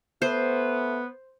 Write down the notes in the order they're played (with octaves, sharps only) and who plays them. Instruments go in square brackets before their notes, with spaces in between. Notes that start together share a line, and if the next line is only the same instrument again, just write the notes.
[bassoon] A3 [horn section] B3 [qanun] C5